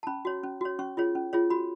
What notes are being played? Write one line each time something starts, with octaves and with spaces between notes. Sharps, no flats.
A5
C#4 B5
F#4 C#5
C#4
F#4 C#5
C#4 C#6
F4 G#4 C#5
C#4
F4 G#4 C#5
F#4 B5